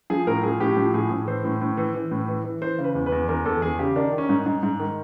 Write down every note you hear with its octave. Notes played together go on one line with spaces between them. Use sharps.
F3 G#4
A2 A#4
F3 G#4
A2 G4
F3
A2 G#4
A2
E3 C5
A2
A2
E3
E3
A2
E3
E3
E3 C5
C#3
B4
E2
B4
E2
E2 A#4
E2 A4
E2 G#4
C#3 G4
D#3 D4
D#3
C#4
G#2
G#2
G#2
D#3